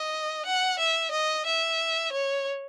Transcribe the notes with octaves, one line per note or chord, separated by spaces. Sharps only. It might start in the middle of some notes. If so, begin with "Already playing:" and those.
Already playing: D#5
F#5
E5
D#5
E5
C#5